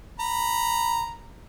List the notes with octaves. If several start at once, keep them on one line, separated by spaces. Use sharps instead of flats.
A#5 B5